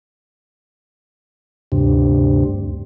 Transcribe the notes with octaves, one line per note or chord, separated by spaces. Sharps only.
D2 G2 C3